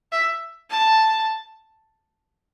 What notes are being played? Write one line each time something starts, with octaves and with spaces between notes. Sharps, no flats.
E5
A5